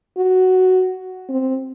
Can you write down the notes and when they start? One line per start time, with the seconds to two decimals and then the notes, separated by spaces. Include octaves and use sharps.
0.17 F#4
1.29 C4